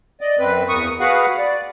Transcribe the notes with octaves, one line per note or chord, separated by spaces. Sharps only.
D5 D#5
F#2 C4 B4
E2 A#3 C#6 D#6
F#4 G#4 B4 F5 F#5
D5